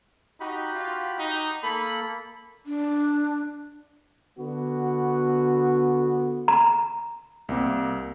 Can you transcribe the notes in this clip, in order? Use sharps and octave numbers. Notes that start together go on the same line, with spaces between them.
D#4 F#4 G4 B5
F4
D#4
A#3 A4 B5
D4
D3 B3 F#4
A#5
C2 A#3 C4